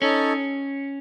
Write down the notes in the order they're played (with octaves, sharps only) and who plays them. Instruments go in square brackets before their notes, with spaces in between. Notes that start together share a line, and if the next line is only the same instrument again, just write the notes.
[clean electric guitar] C#4 [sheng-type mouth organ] D#4 A4 C#5